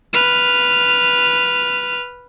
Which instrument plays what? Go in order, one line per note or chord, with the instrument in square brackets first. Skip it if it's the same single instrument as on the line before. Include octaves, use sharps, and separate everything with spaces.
[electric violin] B4 F6